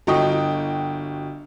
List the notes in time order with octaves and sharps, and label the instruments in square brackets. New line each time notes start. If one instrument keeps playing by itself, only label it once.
[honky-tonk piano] G1 F#4 D#5 G5 C#6 D#6